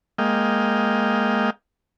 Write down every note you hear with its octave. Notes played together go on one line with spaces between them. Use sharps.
G#3 A#3 D#5 F5 G5